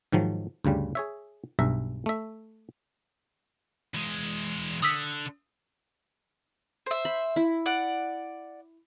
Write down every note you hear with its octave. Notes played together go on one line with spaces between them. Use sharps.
G#2 D#3 F3 F#3
D2 G2 C#3 G3
G#4 C#5 E5
B1 G2 E5 A#5
A3 E5
E2 G#3
D3 D#6 E6 B6
C5 E5
B5
E4
D5 F#5